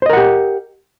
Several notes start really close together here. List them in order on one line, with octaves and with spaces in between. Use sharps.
C5 D#5 A#4 F#5 G4